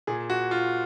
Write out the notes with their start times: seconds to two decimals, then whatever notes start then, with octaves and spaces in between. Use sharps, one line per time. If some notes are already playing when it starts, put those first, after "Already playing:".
0.07 A#2 G#4
0.30 F#4
0.51 F4